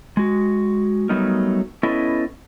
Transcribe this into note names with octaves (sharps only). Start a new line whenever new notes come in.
G#3 F#4
F#3 G3 A3 B3 D#4 A#4
B3 C#4 E4 A4 B4 D#5